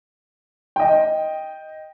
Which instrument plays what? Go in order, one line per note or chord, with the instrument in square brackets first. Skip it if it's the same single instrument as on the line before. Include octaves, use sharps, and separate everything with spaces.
[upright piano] D#5 G5